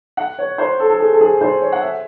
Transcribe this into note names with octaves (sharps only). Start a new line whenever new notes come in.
F#5
C#5
C5
A4
A4
G#4
A4
G#4
C5
C#5
F#5
E5